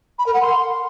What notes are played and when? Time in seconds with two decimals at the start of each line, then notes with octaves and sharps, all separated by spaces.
0.18 B5
0.26 A#4
0.34 F#5
0.41 C6